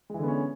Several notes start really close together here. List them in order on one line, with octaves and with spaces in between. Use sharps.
G#3 E3 D3 B3 C#4